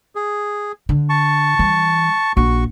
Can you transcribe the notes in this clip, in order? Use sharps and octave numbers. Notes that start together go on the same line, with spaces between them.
G#4
D3
A5 C#6
E3 G3
A#1 F#4 C#6